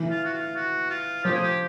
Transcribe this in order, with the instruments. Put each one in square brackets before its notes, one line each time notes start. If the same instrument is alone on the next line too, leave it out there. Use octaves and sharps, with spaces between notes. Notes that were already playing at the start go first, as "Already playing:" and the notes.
Already playing: [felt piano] E3
[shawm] F4
F#4
F4
F#4
F4
[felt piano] F3 [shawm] G4
[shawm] G#4
G4